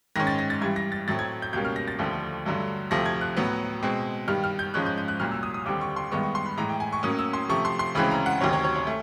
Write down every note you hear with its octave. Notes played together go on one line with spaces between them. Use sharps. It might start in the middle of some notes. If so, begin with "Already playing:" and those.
G#2 D#3 G#3 C#4 A#6
A6
A#6
A6
G2 E3 G3 G#6
A#6
A6
A2 F#3 A3 C4 A6
G#6
G6
C#2 B2 G3 A#3 C#4 G6
F6
A#6
A6
D#2 D3 F3 A3
G2 D3 F#3 A3
D2 C3 F3 A3 A#6
G#6
F#6
A2 F#3 B3
B2 G#3 C4
G2 D#3 G3 F6
F6
G6
G#2 F3 G#3 C#4 F#6
G6
G6
F#6
C2 A#2 F#3 F6
E6
D#6
D#6
D#2 D3 G3 C4 D6
C#6
C6
G2 D#3 G#3 B3 C#6
C#6
C6
B5
A2 E3 G#3 A#5
G5
G#5
C#6
A2 F#3 A#3 C#4 D#6
E6
C6
C3 F3 A3 C#6
C6
C6
D2 C#3 E3 G#3 C4 B5
A#5
F#5
D2 C3 D#3 F#3 C#5
C#5
C#5
C#5
A3